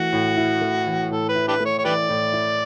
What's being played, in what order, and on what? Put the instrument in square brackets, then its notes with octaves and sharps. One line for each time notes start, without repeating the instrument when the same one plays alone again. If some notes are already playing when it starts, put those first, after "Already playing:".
Already playing: [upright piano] E3 A3 [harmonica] F#4
[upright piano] A2
E4
A3
E3
[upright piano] A2 [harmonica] A4
[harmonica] B4
[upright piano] E4
[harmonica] D4 G4 B4
[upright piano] A3
[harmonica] C#5
C#5
[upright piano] E3 [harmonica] G4 B4 D5
[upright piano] A2
E4